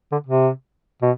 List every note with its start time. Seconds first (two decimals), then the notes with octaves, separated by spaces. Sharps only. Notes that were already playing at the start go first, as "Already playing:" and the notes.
0.12 D3
0.27 C3
1.02 B2